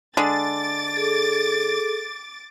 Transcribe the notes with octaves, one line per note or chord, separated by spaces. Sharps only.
D3 G#3 D6 A6
G#4 A4